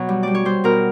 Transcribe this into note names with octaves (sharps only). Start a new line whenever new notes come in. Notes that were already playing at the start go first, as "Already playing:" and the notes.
Already playing: B2 F#3 C#5
G3
G3 D5
C#5
G3 C5
B2 A#4